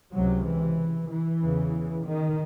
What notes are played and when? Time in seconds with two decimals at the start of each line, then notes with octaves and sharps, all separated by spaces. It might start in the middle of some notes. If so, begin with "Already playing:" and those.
0.13 C#2 C3 F#3
0.45 E3
1.09 E3
1.41 E2 C#3
2.05 D#3